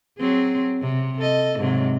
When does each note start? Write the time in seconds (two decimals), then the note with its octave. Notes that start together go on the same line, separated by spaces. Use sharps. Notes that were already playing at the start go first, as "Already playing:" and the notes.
0.18 F#3 C4 G#4
0.82 C3
1.19 A4 D#5
1.59 G#2 C3 F#3